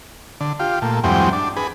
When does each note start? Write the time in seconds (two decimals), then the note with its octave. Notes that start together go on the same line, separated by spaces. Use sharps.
0.41 D3
0.60 F4 G4
0.82 A#2 A3
1.04 E2 G2 F#3 G#3 C4 G5
1.33 D4
1.57 G#4 B4